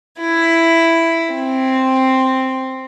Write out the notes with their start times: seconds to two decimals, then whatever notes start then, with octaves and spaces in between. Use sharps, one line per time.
0.21 E4
1.33 C4